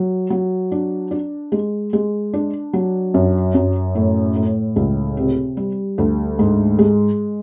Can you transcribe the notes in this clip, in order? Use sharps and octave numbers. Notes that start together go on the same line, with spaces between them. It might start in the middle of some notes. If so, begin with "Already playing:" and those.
Already playing: F#3
F#3
D4
D4
G#3
G#3
D4
F#3
F#2
F#2
A2
A2
C#2
C3
G3
D2
G#2
G#3